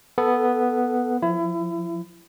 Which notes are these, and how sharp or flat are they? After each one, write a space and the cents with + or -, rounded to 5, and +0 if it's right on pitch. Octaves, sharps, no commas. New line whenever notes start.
B3 +0 A4 +0
F3 +10 E4 +30